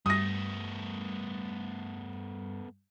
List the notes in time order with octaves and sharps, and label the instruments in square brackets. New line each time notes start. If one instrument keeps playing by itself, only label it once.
[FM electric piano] G2 G3 [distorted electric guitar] A3 B3 [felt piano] D#6 A#6